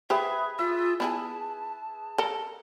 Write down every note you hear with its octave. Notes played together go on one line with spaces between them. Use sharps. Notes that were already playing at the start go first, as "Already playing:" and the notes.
G4 G#4 B4 C5 E5
F4 E5
B3 E4 G#4 A5
A4 A#4